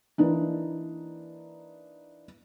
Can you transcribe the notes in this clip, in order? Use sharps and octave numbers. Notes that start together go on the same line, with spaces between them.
E3 A#3 D4 D#4